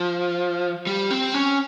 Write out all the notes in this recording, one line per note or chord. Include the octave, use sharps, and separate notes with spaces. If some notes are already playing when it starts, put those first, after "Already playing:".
Already playing: F3
G3
C4
C#4